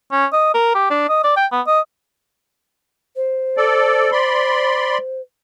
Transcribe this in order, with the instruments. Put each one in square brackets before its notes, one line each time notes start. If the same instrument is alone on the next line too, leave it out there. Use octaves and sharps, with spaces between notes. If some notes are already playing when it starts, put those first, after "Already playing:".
[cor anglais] C#4
D#5
A#4
G4
D4
D#5
D5
G5
B3
D#5
[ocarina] C5
[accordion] A4 D5
D5 B5 C6